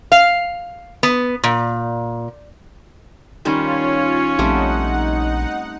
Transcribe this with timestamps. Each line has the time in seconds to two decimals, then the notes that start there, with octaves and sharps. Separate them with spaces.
0.12 F5
1.03 B3
1.44 A#2
3.45 D#3 G3 C#4 F4 C5 C#5
4.39 A#1 G3 A3 C4 D#4 F#5